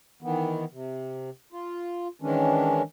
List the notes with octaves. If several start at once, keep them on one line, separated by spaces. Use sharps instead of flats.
D#3 E3 B3
C3
F4
D#3 E3 G#3 C#4 D4